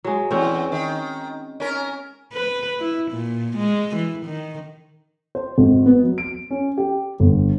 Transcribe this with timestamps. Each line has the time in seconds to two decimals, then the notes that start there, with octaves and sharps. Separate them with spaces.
0.04 F#3 G#3
0.31 E2 C4 C#4
0.72 D#3
1.60 C#4 A#4
2.33 B4
2.80 E4
3.12 A#2
3.57 G#3
3.96 E3
4.26 D#3
5.35 C5
5.58 G#1
5.86 B3
6.04 F#3
6.18 D7
6.51 C#4
6.78 G4
7.20 G1